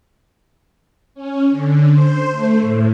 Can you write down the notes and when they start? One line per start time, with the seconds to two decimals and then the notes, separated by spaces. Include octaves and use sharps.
1.15 C#4
1.50 D3
1.91 C5
2.31 A3
2.60 A2